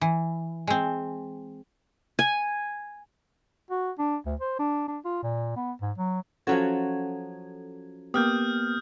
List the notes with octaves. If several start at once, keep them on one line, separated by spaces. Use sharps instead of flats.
E3
G#3 C4
G#5
F#4
D4
D2
C5
D4
D4
F4
A#2
B3
G#2
F#3
F3 F#3 C#4 F#4 A4 G#6
A#3 B3 G4 D#6 F6 G6